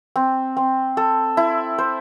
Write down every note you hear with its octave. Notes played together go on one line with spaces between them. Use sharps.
C4
C4
A4
E4
C5